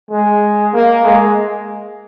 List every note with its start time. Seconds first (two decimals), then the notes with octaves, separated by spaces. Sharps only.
0.11 G#3
0.74 A#3
1.05 G#3